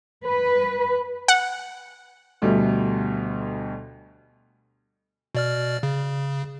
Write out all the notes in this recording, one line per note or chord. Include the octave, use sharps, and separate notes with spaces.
B4
F#5
D2 B2 G3 A3
B2 D5 F6
C#3